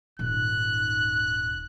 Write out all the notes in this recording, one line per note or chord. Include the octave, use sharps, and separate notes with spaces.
D#1 G#2 F#6